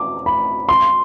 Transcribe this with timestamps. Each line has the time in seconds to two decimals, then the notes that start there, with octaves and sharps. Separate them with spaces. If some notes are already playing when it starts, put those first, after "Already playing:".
Already playing: D6
0.26 B5
0.69 C6